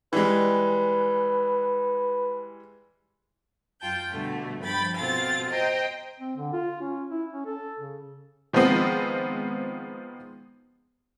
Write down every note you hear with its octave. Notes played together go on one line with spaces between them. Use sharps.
E3 G3 G#3 B4
F#2 F4 G5 A5 G6
B2 D3 G3 A3
G2 F3 G5 B5 A6
B2 C4 F4 A4 A6
C5 D#5 G5 A#5
C4
D3
F4
C#4
E4
C#4
A4
C#3
D#3 F3 G#3 B3 C4